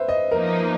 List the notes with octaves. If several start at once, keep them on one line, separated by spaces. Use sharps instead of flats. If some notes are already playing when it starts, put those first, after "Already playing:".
Already playing: B4 C5 E5
D#5
F3 A#3 D#4 A#4